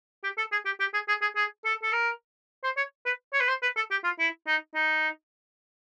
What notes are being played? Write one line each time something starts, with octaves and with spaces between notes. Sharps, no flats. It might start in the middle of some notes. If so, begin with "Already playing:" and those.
G4
A4
G#4
G4
G4
G#4
G#4
G#4
G#4
A4
A4
A#4
C5
C#5
B4
C#5
B4
C5
B4
A4
G4
F4
E4
D#4
D#4